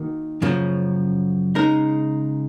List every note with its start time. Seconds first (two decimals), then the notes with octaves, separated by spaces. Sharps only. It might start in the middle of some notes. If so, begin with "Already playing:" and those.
Already playing: D#3 A#3 F#4
0.42 F#2 C#3 F3 A#3
1.55 C#3 G#3 D#4 A#4